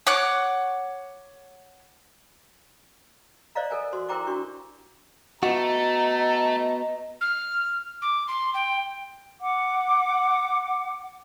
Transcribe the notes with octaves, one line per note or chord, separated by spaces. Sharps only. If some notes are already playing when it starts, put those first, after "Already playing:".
C#5 F#5 D6 F#6
C5 D5 D#5 F5 A#5
A4 A#4 G#5
F#4 C5 C6
E4 A#4 C5 G5 A#5 D6
D4 F#4 C#6
A3 B3 F#4 D#5 A#5
F6
D6
C6
G5
F#5 D6